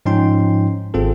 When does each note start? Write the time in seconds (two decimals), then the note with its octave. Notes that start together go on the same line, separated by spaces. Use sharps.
0.06 G#2 F3 C#4 D#4 G5 C6
0.94 G#1 C4 F4 G#4 A4